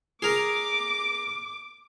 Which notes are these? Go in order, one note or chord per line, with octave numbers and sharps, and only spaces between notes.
G#4 A#4 D6